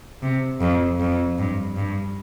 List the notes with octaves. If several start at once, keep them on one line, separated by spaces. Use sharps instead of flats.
C3
F2
F2
G2
G2